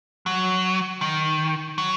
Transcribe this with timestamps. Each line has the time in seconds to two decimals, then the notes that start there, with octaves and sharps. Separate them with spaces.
0.26 F#3
1.01 D#3
1.78 F#3